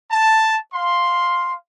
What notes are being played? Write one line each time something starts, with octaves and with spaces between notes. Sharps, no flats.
A5
F5 C6